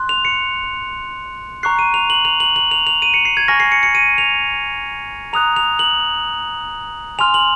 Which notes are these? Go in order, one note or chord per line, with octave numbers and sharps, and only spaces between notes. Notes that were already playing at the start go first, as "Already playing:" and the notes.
Already playing: C6 F#6
F7
C#7
A#5 C#6 F#6 C7
D#7
F7
F#7
F7
F#7
F#7
F7
F7
D#7
C#7
C7
G#6
G#5 C#6 F6 A#6
C7
C#7
C#7
D#7
F7
A#5 D#6 F#6 F7
F7
F#7
G#5 C6 F6 F7
F#7